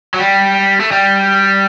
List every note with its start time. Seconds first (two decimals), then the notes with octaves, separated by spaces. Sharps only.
0.14 F#3
0.19 G3
0.80 A3
0.91 G3